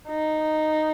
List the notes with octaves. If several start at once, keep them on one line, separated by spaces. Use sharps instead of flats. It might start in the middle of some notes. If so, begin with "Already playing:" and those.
D#4